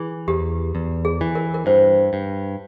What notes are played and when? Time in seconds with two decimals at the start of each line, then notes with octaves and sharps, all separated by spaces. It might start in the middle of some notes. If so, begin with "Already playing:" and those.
Already playing: E3 G#4
0.28 E2 G4
0.75 E2
1.05 G#4
1.21 E3
1.35 A#4
1.54 A#4
1.66 G2 C5
2.13 G2